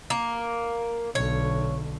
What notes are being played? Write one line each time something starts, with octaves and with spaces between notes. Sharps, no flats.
A#3
B1 D3 C#5